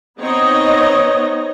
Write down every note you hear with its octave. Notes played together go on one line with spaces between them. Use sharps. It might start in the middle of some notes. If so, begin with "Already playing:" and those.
B3 C4 D#4 C#5 D#5